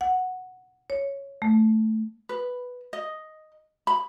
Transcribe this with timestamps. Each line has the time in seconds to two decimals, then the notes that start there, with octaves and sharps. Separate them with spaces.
0.01 F#5
0.90 C#5
1.42 A3
2.29 B4
2.93 D#5
3.87 B5